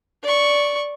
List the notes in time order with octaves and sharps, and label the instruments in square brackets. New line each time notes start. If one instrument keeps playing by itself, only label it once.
[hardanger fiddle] D5 C#6